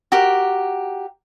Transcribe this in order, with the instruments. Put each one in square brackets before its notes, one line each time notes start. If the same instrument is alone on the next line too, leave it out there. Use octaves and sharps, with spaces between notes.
[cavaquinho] F#4 G4 A#4